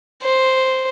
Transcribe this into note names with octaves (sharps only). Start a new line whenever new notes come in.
C5